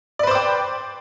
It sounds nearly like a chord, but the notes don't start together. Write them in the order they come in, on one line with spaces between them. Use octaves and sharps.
D5 B4 C5 D6 G5